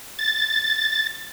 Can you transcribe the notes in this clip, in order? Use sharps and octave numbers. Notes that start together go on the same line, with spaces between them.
A6